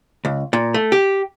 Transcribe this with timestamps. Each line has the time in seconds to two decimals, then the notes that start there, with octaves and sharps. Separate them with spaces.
0.25 C#2
0.53 A#2
0.74 A3
0.92 G4